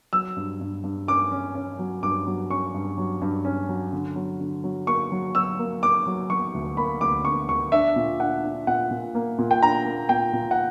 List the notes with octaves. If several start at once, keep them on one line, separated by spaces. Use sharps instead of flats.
F#3 E6
G2
G2
G2
C#4 D6
C#4
C#4
F#3
G2 D6
F#3
C#4 C#6
G2
F#3
G2
C#4
F#3
D3
F#3
D3
F#3
A#3 C#6
F#3
F#3 E6
A#3
A#3 D6
F#3
F#3 C#6
D2
A#3 B5
D2 D6
D3 C#6
D2 C#6
D4 E5
A#2
D4 F#5
D4
A#2 F#5
A#2
A#3
A#2
G5
D4 A#5
A#3
A#2 G5
A#2
F#5